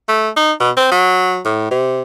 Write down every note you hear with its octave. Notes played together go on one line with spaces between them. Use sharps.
A3
D#4
B2
C4
F#3
A2
C3